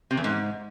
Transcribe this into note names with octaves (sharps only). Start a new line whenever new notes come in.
C3
E2
G#2